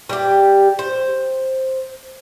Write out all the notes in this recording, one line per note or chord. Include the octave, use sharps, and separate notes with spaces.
G3 G4
C5